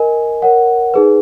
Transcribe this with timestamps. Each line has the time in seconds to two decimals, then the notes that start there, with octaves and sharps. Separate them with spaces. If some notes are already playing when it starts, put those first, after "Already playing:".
Already playing: A#4 D#5 G#5
0.42 A#4 C#5 F#5
0.94 D#4 G#4 B4